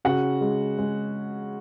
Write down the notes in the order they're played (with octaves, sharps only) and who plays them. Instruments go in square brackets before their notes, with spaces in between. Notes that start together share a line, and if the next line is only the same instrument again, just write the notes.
[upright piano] C#3 F#4 F#5
G#3
G#3